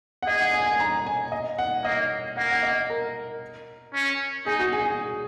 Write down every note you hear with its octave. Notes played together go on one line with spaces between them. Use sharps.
F#5
G#4 D#5
F#5
G#5
G#5
A#5
G#5
D#5
F#5
A#3 D#5
A#3 F#5
F#5
D#5
A#4
C#4
D#4 G#4
F#4
G#4
G#4